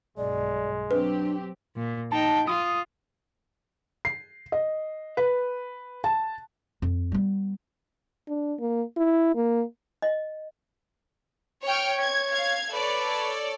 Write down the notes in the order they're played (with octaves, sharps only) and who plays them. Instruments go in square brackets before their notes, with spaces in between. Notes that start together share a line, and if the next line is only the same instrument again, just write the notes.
[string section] B1 G2 [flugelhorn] G#3 [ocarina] D5
[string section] F#3 C4 G4 [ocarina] D4 [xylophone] B4
[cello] A#2
[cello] D#4 G5 [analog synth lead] A5
[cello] F4 [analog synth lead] D#6
[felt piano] C7
D#5
B4
A5
[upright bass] F2
G3 B3
[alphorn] D4
A#3
E4
A#3
[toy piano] D#5
[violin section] C#5 G5 F6
[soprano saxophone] C#5 [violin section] G#6
[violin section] F5 G#6
[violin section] A4 C#5 D5 [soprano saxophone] B4